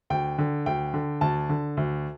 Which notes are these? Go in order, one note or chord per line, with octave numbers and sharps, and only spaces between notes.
D2 G5
D3
D2 G5
D3
D2 A5
D3
D2